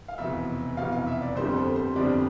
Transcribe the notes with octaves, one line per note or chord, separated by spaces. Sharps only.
F5
F1 E2 B2 E5
F1 E2 B2 F5
F5
E5
D5
G1 F2 D3 G3 C5
A4
C5
G1 F2 D3 G3 D5